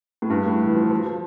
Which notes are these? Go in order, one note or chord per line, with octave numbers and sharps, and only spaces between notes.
A2
G2
A2
E3
F3
F3
F3